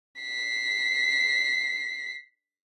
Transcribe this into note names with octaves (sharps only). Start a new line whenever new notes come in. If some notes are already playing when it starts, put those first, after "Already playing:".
B6 C7